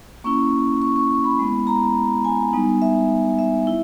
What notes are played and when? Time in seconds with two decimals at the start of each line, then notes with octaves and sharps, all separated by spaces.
0.24 A#3 C#4 E4 C#6
0.82 C#6
0.96 C#6
1.11 C#6
1.24 B5
1.39 G#3 B3 E4
1.67 A#5
2.25 G#5
2.53 G3 B3 D#4
2.82 E5
3.39 E5
3.67 E4